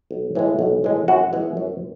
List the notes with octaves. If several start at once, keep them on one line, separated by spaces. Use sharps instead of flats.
B1
A2 E3 G#3
B1
A2 E3 G#3
F#2 F#4
E3 G#3 B3
F#2